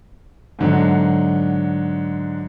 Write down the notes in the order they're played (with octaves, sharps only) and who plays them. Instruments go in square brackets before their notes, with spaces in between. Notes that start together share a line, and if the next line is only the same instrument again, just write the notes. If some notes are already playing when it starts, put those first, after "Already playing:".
[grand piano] G#2 D3 F#3